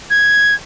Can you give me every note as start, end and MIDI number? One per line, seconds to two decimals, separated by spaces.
0.10 0.55 92